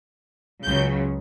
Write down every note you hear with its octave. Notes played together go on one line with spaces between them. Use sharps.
C#2 C#3 F#3 G6